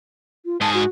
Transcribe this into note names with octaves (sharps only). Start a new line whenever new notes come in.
F4
G#2 G#4 A5
F#4